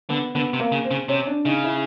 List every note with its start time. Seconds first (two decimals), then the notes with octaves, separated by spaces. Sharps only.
0.10 D3 B3
0.35 D3 B3
0.53 C3
0.60 A#3
0.72 C#3
0.85 C4
0.91 C#3
1.09 C3 C#4
1.27 D4
1.45 C#3 D#4
1.64 E4